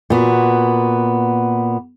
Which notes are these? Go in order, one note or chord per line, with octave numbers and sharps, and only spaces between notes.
A#2 B3 F#4